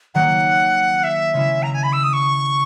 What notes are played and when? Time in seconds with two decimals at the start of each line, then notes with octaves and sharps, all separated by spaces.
0.14 D#3 F#3 A#3 F#5
1.04 E5
1.34 C#3 G#3 C#4 E4
1.63 A#5
1.74 G#5
1.83 B5
1.93 E6
2.03 D#6
2.13 C#6